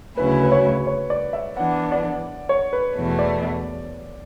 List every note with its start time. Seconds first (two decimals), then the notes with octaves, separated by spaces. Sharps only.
0.17 D2 C#3 F#3 C#4 E4 B4
0.43 B4
0.52 C#5
0.87 C#5
1.10 D5
1.33 E5
1.56 E3 B3 D4 F#5
1.92 D5
2.49 C#5
2.73 B4
2.96 E2 B2 A3
3.19 D5